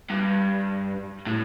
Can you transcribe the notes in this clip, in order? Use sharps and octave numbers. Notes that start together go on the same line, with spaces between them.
G2
A2